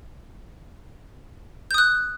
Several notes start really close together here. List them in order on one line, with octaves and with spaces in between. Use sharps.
G6 D#6 F#6